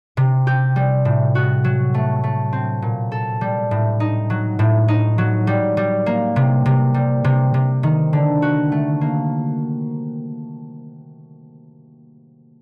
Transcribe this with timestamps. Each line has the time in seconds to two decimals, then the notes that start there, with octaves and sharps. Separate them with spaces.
0.17 C3
0.47 G4
0.76 G3
1.05 A2
1.35 F#4
1.64 F#3
1.94 A3
2.24 A3
2.53 C4
2.82 A#2
3.12 A4
3.41 G3
3.71 A2
4.00 D#4
4.30 F#3
4.59 A2
4.88 D#4
5.18 F#3
5.47 G3
5.77 G3
6.06 A#3
6.36 C3
6.66 C3
6.94 G3
7.24 C3
7.54 C3
7.83 D#3
8.13 D3
8.42 F#4
8.72 A3
9.01 A#3